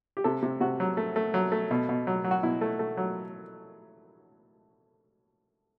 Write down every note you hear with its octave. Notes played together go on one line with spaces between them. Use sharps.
G4
C3 A4
C3
C3 F#4
F#3
A3
A3
F#3
A3
B2
B2
F#3
F#3
F#4
B2 E4
A3
A3
F#3